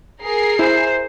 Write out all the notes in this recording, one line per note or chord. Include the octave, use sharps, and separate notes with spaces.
G#4 A#4 C7
E4 C5